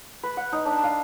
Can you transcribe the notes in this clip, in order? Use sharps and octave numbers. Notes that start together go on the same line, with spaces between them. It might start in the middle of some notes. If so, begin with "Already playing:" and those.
B4
F#5
D#4
D4
F5